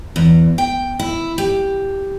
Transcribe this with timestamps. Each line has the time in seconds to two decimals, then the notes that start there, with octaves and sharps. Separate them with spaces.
0.16 E2
0.58 G5
0.99 E4
1.38 G4